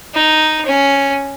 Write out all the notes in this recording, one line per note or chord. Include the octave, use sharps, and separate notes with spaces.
D#4
C#4